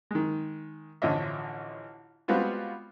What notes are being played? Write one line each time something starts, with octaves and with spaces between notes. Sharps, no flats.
D#3 G#3
A1 D3 F3 C#4 D#5 E5
G3 G#3 B3 C4 F4 F#4